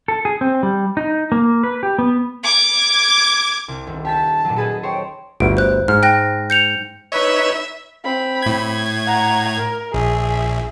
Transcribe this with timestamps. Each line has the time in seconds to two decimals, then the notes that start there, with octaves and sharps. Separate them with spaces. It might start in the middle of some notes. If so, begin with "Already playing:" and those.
0.08 A4
0.25 G#4
0.41 C4
0.63 G3
0.97 D#4
1.32 A#3
1.63 B4
1.83 G4
1.99 B3
2.44 D6 G#6
3.68 C2
3.87 D#1
4.05 G4 G#5 A5 B6
4.45 A#2 F#3
4.56 G#4 A4 B4 D#5
4.83 C5 C#5 G5
5.40 G1 D2 D7
5.57 C5 F#6
5.88 G#2 F6
6.03 G5 F#6 A#6
6.50 G6 C#7 F7
7.12 D#4 B4 C#5 E5
8.04 C4 B5
8.42 A2 G#6
9.07 F#5 A#5
9.57 A#4
9.94 A#1 G#4 E5